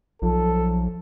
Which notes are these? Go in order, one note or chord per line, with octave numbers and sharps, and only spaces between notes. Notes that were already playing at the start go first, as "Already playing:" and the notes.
B1 F3 A4